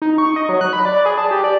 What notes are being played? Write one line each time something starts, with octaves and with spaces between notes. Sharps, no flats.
D#4
C#6
D#5
F#3
F#6
B5
D5
G#4
A5
G4
D5